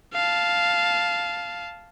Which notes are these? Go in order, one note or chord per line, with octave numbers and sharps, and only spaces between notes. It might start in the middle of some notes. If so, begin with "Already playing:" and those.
F5 A5